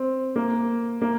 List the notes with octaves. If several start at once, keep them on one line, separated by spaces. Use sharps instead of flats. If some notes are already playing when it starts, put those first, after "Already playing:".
Already playing: C4
A#3
A#3